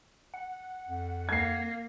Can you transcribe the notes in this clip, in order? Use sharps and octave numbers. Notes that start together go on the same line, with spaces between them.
F#5
F2
A#3 G#6 C7